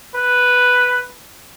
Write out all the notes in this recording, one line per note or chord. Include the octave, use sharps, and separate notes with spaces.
B4